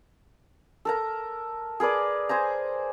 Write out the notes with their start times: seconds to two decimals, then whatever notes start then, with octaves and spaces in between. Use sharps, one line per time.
0.85 A4 A#4 A#5
1.80 G#4 A#4 B4 D5
2.29 G#4 C5 G#5 A#5